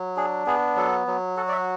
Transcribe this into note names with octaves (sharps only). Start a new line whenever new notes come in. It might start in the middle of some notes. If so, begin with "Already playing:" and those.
Already playing: F#3
D4 G#4
B3 G#4
F#3 A4
F#3
F#4 A4
D5
E5